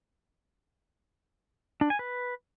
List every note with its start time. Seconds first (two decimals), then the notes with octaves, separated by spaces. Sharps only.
1.81 D4
1.90 G#5
1.99 B4